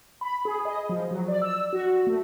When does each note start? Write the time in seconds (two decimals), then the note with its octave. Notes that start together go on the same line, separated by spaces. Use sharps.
0.21 B5
0.45 G#4
0.65 D#5
0.89 F3
1.11 F#3
1.28 D5
1.42 E6
1.73 F#4
2.07 A3